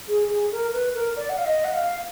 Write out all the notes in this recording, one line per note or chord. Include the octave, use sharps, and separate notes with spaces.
G#4
G#4
A#4
B4
A#4
D5
F#5
F5
D#5
F#5
F5